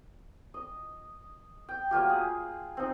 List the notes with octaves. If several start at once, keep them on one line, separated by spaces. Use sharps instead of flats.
D#5
G5
F#3 A#3 F4 G4
G#4
C4 D#4